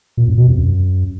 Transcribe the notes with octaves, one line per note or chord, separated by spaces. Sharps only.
A#2
F#2
B2
F2
F#2